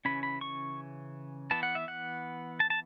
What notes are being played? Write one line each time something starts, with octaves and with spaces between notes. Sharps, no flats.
C#3 E3 C#4 B5
B5
C#6
E3 B3 A5
F#5
E5
F#5
A5
A5